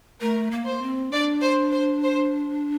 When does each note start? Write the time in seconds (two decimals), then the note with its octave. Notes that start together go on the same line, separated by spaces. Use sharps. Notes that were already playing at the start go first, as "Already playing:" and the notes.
0.21 A3 A#4
0.51 A#3
0.66 C5
0.82 C4
1.12 D4 D5
1.42 C5
1.72 C5
2.03 C5